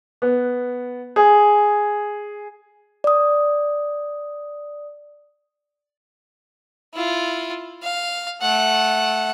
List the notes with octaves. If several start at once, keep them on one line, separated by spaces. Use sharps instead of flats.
B3
G#4
D5 D#6
E4 F4
F5
A3 F#5